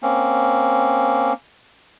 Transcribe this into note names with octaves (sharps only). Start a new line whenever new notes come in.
A#3 C4 C#4